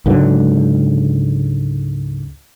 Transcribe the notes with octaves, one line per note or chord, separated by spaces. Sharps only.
C#2 G#2 D3 F#3